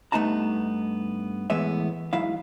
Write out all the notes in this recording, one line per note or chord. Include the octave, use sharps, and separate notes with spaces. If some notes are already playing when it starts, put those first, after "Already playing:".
G2 A3 B3 D#4 A5 A#5
A2 E3 G#3 B3 E5
G#2 F#3 E4 F5